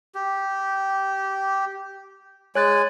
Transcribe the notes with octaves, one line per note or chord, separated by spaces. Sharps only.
G4
G#3 C#5 G#5 F#6 A6